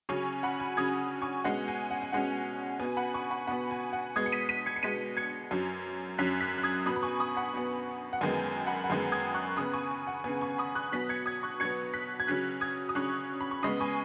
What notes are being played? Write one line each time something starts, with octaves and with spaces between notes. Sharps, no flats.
C#3 F#3 C#4 G#5 C#6
F#5 B5
G#5
C#3 F#3 C#4 D#6 G#6
G#5 C#6
B2 G#3 C#4 F#5
G#5
F#5
G#5
B2 G#3 C#4 F#5
B2 B3 G#5
F#5 B5
G#5 C#6
F#5 B5
B2 B3 F#5 B5
G#5
F#5
B2 G#3 B3 D#6 G#6
C#7
B6 D#7
B6 D#7
G#6 C#7
C#7
B2 G#3 B3 B6 D#7
G#6 C#7
F#2 F#3 C#4
F#2 F#3 C#4 F#6 B6
F#6 B6
F#6
D#6 G#6
B2 B3 B5 D#6
B5
G#5 C#6
B5 D#6
F#5 B5
B2 B3
F#5
F#2 D#3 G#3 B3 G#5
G#5
F#5 B5
F#5
F#2 D#3 G#3 B3 G#5
D#6 G#6
C#6 F#6
C#3 B3 B5 D#6
G#5 C#6
G#5
F#5
C#3 B3 G#5
G#5 C#6
B5 D#6
C#6 F#6
B2 F#3 B3 F#6 B6
G#6 C#7
D#6 G#6
C#6 F#6
B2 F#3 B3 G#6 C#7
F#6 B6
G#6
C#3 F#3 C#4 F#6 B6
D#6 G#6
D#6
C#3 F#3 C#4 C#6 F#6
B5
C#6
C#3 G#3 B3 B5 D#6
G#5 C#6